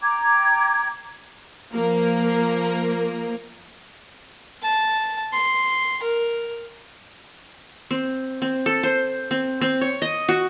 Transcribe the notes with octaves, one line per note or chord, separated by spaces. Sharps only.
G5 A#5 D6 G#6
F3 A#3 A#4
A5
C6
A#4
C4
C4
A4
C5
C4
C4
C#5
D#5
F#4